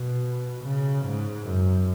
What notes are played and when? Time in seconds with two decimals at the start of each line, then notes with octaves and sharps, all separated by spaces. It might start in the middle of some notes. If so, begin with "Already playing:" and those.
Already playing: B2
0.64 C#3
1.06 G#2
1.47 F#2